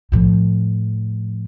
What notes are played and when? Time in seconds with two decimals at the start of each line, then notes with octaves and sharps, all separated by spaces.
0.12 A2 F3